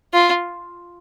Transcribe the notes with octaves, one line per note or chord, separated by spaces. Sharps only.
F4